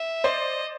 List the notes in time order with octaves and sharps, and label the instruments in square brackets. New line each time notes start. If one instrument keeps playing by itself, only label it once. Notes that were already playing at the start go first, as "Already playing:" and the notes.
Already playing: [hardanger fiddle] E5
[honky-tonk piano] C5 D5 [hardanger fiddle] D#5